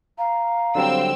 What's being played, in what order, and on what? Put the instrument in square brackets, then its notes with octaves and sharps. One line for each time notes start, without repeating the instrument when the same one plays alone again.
[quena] F5 [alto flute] A#5
[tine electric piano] D3 F#3 G3 [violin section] C4 E6